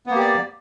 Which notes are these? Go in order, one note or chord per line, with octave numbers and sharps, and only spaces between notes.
A#3 B3 G4 D5